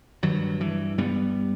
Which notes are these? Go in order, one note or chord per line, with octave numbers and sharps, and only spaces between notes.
G2 D#3 F#3
E3
G2 G3 B3